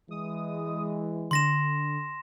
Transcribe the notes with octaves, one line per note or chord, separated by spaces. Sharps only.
E3 G#3 D#6
D3 C6 A#6 E7